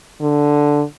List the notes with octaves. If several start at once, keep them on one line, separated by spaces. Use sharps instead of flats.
D3